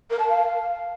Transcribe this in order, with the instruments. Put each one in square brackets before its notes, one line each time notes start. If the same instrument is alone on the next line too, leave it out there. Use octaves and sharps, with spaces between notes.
[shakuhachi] A#4
A5
F5